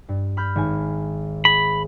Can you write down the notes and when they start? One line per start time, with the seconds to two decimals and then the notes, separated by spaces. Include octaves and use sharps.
0.09 G2
0.37 B5 F6 G6
0.56 G#1 G#5
1.45 G#4 B5